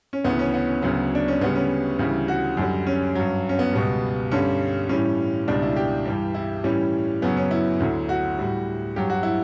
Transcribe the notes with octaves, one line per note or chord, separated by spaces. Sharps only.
C#4
D2 C#3 E3 B3
C#4
B3
C#4
D2 C#3 F#3 B3
D4
C#4
D2 C#3 G3 B3
C#4
D2 C#3 E3 G3
F#4
F#2 D3 G3
C#4
G2 F#3
C#4
B3
C#2 B2 G3
G2 D3 G3 C#4
A2 E3 G3 C#4
C#2 B2 G3 D4
E4
G4
G2 E3 G3
E4
A2 E3 G3 C#4
F#2 C#3 F#3 B3
C#4
E4
D2 D3 F#3
F#4
A2 G3
G2 F#3 G4
F#4
E4